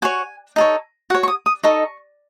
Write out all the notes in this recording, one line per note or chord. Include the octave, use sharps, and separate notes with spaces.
F#4 C#5 G#5
D#4 A4 C#5
F#4 C#5 F#5
C#6
D#6
D#6
D#4 A4 D#5 C#6